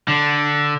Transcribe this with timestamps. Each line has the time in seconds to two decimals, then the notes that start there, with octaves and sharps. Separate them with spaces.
0.08 D3